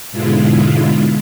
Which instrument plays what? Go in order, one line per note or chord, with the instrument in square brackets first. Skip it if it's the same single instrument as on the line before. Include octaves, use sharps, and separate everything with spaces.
[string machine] G#2 B2 D3 G#3 E4 F4